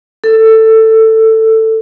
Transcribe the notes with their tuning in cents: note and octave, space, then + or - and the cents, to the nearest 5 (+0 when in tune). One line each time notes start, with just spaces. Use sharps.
A4 +15